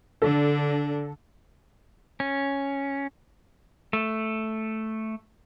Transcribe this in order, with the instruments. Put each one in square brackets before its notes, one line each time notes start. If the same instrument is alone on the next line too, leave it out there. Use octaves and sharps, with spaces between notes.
[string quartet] D3 D4 [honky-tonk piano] A4
[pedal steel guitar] C#4
[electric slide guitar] A3